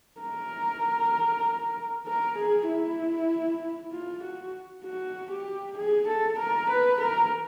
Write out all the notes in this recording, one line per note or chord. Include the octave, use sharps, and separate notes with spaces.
A#4
A#4
G#4
E4
F4
F#4
F#4
G4
G#4
A4
A#4
B4
A#4